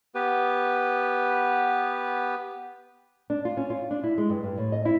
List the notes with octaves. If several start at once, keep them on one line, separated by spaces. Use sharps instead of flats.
B3 G4 B4
D4
F4
C#4
F4
D4
E4
G#3
G2
G2
A2
D#5
E4